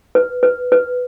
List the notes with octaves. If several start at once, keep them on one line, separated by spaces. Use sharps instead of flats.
B4
B4
B4